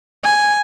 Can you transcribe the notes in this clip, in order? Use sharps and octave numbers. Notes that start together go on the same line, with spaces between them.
G#5